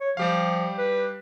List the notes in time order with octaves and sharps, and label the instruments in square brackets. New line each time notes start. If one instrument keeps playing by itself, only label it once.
[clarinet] C#5
[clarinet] F3 [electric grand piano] G3 G4 F5
[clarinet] B4